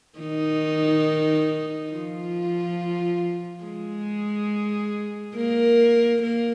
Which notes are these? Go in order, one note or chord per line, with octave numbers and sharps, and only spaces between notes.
D#3 D#4
F3 F4
G#3 G#4
A#3 A#4
A#3 A#4